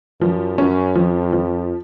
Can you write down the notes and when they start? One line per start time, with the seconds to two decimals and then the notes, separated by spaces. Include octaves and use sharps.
0.20 F#2 F3
0.58 F#2 C#4
0.95 F2 F3
1.33 F3